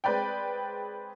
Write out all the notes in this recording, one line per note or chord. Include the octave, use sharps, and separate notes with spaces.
G#3 C4 B4 D5 G5